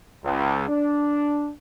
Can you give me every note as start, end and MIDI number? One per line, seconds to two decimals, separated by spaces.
0.24 0.68 37
0.68 1.49 62